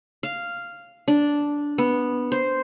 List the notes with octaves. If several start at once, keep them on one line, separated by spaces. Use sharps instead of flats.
F5
D4
B3
C5